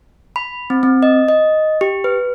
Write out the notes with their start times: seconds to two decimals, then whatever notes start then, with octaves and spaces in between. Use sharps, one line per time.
0.36 B5
0.70 C4
0.83 C4
1.03 D#5
1.28 D#5
1.81 G4
2.04 B4